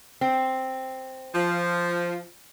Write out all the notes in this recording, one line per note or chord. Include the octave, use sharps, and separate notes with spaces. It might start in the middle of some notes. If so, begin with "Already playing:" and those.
C4
F3